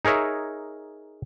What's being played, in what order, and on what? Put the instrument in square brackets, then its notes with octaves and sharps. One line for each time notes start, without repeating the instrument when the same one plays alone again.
[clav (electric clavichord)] D#4 G#4 A#4 C#5 E5